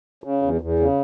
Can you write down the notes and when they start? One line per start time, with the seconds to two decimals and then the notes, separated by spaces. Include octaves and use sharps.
0.24 C#3
0.42 E2
0.61 E2
0.80 C#3